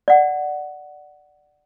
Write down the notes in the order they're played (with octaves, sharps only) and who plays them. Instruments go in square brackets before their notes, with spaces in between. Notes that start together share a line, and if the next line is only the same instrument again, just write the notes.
[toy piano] D5 F#5